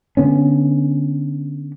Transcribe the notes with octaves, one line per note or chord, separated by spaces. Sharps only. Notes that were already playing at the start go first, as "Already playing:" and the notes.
D3 B3 C#4